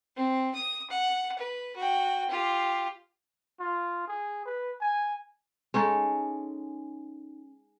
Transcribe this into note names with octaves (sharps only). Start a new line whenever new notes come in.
C4
D#6
F#5
B4
F#4 G5
F4 G4
F4
G#4
B4
G#5
G#3 C#4 D#4 A4